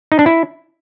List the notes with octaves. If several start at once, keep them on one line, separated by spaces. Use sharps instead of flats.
D#4
D4
E4